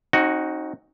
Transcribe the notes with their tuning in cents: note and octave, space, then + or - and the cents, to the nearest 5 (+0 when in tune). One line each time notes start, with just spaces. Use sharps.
C4 +45 D#4 +0 F#4 +0